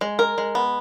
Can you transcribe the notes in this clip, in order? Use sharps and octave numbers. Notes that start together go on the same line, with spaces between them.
G#3
A#4
G#3
B3